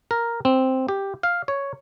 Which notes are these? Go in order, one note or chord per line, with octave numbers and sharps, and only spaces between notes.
A#4
C4
G4
F5
C#5